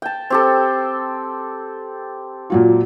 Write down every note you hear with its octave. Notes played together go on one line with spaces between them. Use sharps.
G5 A5
C4 G4 A4
A#2 F#3 F4